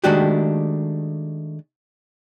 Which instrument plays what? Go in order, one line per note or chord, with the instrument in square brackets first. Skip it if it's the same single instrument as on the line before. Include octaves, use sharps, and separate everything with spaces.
[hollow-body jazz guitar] D#3 G#3 A3 D4 F#4 G4